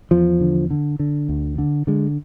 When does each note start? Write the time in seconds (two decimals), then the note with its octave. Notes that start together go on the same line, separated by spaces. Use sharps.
0.11 E2 F3
0.41 D3
0.70 D3
0.99 D3
1.29 D2
1.58 D3
1.87 D3 G#3